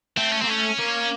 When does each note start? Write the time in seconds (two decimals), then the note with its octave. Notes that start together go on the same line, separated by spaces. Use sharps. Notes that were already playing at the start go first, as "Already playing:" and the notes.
0.17 A3 C4
0.32 C#4
0.42 A#3 C4
0.47 A3 C#4
0.79 A#3